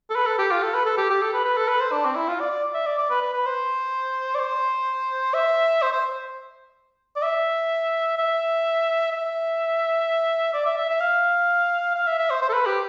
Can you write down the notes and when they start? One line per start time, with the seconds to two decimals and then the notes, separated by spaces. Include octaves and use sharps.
0.10 A4
0.15 B4
0.26 A4
0.39 G4
0.51 F4
0.63 A4
0.74 B4
0.86 A4
0.98 G4
1.10 G4
1.22 A4
1.33 B4
1.45 B4
1.57 A4
1.69 B4
1.80 C5
1.92 D4
2.05 C4
2.15 E4
2.28 F4
2.40 D5
2.51 D5
2.74 E5
2.86 D5
2.98 D5
3.10 B4
3.22 B4
3.33 B4
3.46 C5
4.35 D5
4.40 C5
5.34 E5
5.82 C5
5.93 C5
7.16 D5
7.22 E5
8.18 E5
9.12 E5
10.54 D5
10.66 E5
10.77 E5
10.89 E5
11.00 F5
11.95 F5
12.07 E5
12.19 E5
12.30 C5
12.42 C5
12.50 A4
12.53 B4
12.66 G4